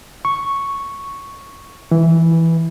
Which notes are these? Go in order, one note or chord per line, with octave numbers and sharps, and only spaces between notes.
C#6
E3